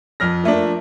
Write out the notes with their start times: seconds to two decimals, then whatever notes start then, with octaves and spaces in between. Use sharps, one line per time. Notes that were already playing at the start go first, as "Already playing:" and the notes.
0.20 F2 F6 A#6
0.44 F3 A3 A#3 D4